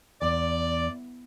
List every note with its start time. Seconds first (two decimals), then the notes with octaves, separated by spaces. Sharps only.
0.22 E2 D5